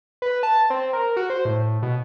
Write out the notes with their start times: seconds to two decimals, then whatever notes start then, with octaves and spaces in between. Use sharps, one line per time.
0.22 B4
0.43 A5
0.70 C4
0.93 A#4
1.17 F#4
1.30 C5
1.45 A2
1.82 B2